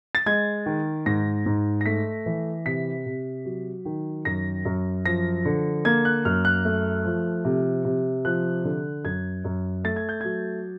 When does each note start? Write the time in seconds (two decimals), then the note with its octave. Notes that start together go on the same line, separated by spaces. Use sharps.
0.15 A6
0.26 G#3 G#6
0.66 D#3
1.06 G#2 A#6
1.46 G#2
1.81 A#6
1.86 A3 B6
2.26 E3
2.66 C3 B6
3.06 C3
3.45 F#3
3.85 D#3
4.25 F#2 A#6
4.65 F#2
5.06 F3 A#6
5.45 D3
5.85 A#3 G#6
6.05 F#6
6.25 F#2 F6
6.45 F#6
6.65 A3
7.05 F3
7.45 C3
7.85 C3
8.25 F3 F#6
8.65 D3
9.05 F#2 G#6
9.44 F#2
9.84 A3 A6
9.96 G#6
10.09 G6
10.21 F#3 G#6